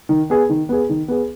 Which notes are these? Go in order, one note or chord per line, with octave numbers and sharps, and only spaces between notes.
D#3
B3 G#4
D#3
B3 G#4
D#3
B3 G#4